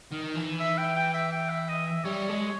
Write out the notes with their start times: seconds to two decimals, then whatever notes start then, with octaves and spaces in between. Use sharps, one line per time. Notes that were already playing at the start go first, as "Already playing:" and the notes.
0.12 D#3
0.36 E3
0.60 E5
0.78 G5
0.96 G5
1.14 E5
1.32 G5
1.50 E5
1.69 D#5
1.87 E5
2.04 G3 C#5
2.29 G#3